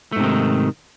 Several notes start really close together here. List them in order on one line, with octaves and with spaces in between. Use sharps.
A3 G#2 C3 D#3